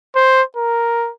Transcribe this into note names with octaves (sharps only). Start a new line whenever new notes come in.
C5
A#4